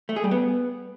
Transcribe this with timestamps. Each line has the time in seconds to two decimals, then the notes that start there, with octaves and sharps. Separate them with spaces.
0.09 A3
0.16 G#4
0.24 G3
0.31 B3